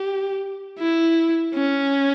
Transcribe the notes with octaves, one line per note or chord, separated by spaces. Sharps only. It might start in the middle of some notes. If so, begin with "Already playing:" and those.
Already playing: G4
E4
C#4